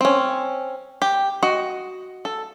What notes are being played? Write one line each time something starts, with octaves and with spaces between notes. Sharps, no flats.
C4 C#4
G4
F#4 D#5
A4